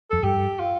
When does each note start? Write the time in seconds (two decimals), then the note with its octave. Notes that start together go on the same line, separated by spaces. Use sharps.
0.11 F2 A4
0.23 G2 G4
0.60 F4